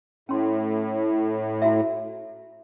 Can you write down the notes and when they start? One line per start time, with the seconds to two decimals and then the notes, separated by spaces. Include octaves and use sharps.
0.29 A2 C#4 C6
1.62 E4 F#4 E5